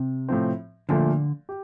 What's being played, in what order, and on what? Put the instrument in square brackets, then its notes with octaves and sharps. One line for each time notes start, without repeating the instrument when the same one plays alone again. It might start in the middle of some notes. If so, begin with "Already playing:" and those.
Already playing: [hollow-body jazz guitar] C3
[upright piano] A2 F3 C4
[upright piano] A#2 F3 A3 [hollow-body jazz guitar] D3
[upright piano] G4